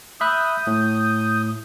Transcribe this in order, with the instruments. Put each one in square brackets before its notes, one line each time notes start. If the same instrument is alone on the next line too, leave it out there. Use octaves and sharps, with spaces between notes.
[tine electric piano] E5 B5 F#6 [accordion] D#6 G6
[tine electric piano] A2